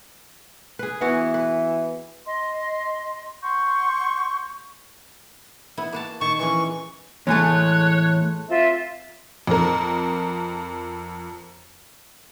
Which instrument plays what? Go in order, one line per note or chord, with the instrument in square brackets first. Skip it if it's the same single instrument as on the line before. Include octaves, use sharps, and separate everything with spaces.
[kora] G#4 B4
[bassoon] E3 [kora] B3 E4 F#4
[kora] B4
[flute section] D#5 C6
F#5 C6 C#6 G6
[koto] B3 E4
A#3 F#4 A5
[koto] A#2 D#3 A5 [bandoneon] C#6
[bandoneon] E3 C#6 [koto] F3 G#3 C#4
[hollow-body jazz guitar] E2 A2 G#5 [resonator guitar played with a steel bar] G#3 A3 [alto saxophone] C#5 [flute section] F#6
[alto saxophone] C4 [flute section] F4 E5
[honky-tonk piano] F2 A#4